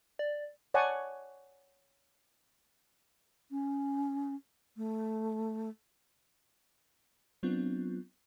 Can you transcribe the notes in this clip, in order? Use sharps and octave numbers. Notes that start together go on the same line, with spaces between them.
D5
C#5 D5 F#5 G#5 A5 C#6
C#4
A3
F#3 B3 C4 D4 F4